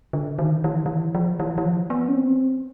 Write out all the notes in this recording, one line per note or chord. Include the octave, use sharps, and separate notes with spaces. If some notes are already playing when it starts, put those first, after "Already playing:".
D3
D#3
E3
D#3
E3
F3
E3
E3
F3
B3
C#4
C4